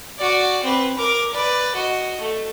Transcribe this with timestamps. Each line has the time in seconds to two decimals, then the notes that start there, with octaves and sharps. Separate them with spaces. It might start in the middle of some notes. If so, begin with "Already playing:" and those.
0.18 F#4 D5
0.63 C4 B4
0.97 A#4 D6
1.33 B4 D5
1.74 F#4 D#5
2.21 A3